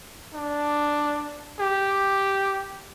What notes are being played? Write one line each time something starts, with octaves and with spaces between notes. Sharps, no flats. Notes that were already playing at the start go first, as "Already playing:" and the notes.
D4
G4